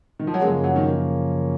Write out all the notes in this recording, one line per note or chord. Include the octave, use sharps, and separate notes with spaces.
D#3
F3
F#3
F#2 C#3 F3 G#3 A#3 C#4
F#3
D#3